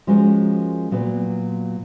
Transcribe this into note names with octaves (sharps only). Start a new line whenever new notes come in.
F3 G#3 C#4 F#4 A#4
A#2 F#3 B3